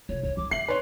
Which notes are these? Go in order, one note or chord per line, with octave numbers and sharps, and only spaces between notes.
F2 C3 C#5
C#2 C#5
F2 D#3 D6
C4 E5 C7 F#7
B4 C#5 C6